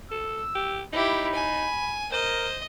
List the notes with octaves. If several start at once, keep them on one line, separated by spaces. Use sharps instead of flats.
A4 E6
G4
D#4 E4 G4 B5
G#5
A#4 C5 D#5